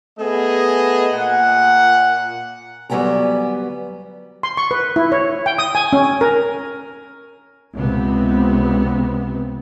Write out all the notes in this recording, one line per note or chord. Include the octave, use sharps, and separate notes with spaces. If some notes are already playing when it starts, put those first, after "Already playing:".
A3 B3 G#4 D#5
A#2 F#5
D2 F#3 G3 B3 G#5 A#5
C6
C#6
B4
E4
C#5
G5
D#6
G#5
C#4
A#4
C#2 C3 B3 C4